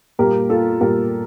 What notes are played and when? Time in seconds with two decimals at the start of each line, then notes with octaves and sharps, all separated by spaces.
0.19 A#2 G3 A#3 G4 A#4
0.50 F4 A4
0.81 A#2 G3 A#3 G4 A#4